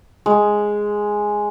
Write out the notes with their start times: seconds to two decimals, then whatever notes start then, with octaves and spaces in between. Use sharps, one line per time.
0.26 G#3